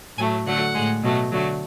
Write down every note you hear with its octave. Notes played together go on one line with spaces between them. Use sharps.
A2 F#3 A3 G#5
D3 F#3 A3 F#5
A2 G#3
B2 F#3 A3
D3 F#3 A3